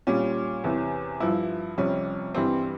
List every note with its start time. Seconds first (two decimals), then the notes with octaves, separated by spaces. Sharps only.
0.07 A#2 G3 C#4
0.64 E2 C3 E3
1.20 G2 F3 E4
1.78 F2 C3 G3 C#4
2.34 G2 E3 G3 C4